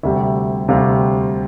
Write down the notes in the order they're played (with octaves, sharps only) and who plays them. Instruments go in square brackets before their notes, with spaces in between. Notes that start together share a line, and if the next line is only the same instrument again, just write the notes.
[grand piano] D2 C3 G3 E5
D2 C3 G3 F5